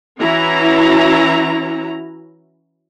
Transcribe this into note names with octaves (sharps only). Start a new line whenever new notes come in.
E3 C#4 E4 F#4 A#5